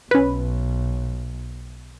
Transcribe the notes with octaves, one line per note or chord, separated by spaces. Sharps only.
B1 C#4 B4